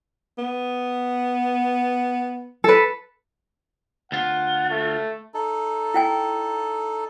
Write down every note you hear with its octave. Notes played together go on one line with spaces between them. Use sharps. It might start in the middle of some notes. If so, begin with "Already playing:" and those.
B3
A4 B4
D2 F4 F#5
A3
D#4 A4
E4 G5 G#5